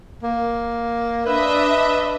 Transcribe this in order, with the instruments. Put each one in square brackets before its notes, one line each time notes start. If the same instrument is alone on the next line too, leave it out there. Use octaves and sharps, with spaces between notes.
[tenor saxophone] A#3
[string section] D4 D#5 E5 [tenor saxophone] B4